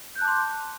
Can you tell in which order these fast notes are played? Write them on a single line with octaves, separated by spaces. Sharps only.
G6 F#6 A5 D6 C6